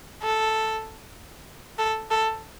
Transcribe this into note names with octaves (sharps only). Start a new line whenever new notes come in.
A4
A4
A4